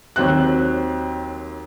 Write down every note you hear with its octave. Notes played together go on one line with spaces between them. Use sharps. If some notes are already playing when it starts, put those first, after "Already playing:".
D#2 F#3 C4 F#6